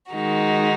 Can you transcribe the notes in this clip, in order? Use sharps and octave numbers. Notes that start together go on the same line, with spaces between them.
D#3 G#3 D#4 F#4